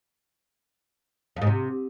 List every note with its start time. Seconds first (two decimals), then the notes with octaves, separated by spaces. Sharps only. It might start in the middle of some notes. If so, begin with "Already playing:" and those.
1.36 F2
1.42 G#2
1.47 C3